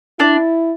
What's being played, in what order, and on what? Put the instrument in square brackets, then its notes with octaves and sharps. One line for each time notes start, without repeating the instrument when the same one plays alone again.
[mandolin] D4 [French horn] E4